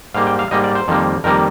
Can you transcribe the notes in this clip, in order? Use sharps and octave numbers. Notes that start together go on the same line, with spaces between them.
G#2 G3 A#3 F5
G5
F5
G#2 G3 A#3 D#5
D5
C5
F2 D#3 G3 A#3
F2 D#3 G3 A#3 A#4